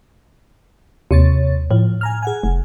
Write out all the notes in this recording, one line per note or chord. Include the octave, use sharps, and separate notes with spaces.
D#2 C3 C#5 A6
A2 F3
G#5 A#5 F6
G#4 F#5 G#5
F1